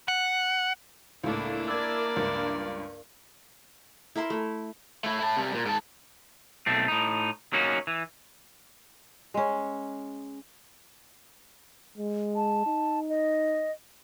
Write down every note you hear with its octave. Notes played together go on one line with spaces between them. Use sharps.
F#5
C#2 A2 A#3 D4 E4
A#4 D5 E6 G#6
C#2 G2
E4 A#4 E5 C6
A3
A3 E4
E4 A5
C3 G3
A#2
G#2 A5
B1 A3 C4
A2 D#4
F#3 A#3 C#4 D#4 F#4
E3
G#3 C#4
G#3
A5
D#4
D#5